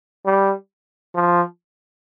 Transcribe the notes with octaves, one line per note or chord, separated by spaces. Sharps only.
G3
F3